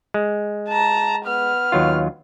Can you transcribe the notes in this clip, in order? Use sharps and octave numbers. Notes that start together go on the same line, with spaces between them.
G#3
A5 A#5
B3 F6
D#2 F#3 F4